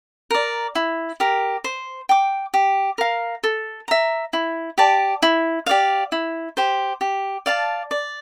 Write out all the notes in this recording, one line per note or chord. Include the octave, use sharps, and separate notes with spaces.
A#4 D5
E4
G4 A#4
C5
G5 D6
G4
A#4 F5
A4
E5 A#5
E4
G4 D5 A5
E4
G4 D5 F5
E4
G4 C5
G4
D5 F5 A5
D5